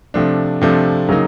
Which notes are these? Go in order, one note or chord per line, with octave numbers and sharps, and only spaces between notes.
C3 F3 A3 D4
C3 F3 A3 D4
C#3 F#3 A#3 D#4